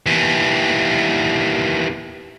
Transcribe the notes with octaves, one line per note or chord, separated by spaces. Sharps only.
D#2 E3